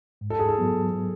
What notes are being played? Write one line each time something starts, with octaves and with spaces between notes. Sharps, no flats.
G#2
A4
G#4
A4
F#3 B3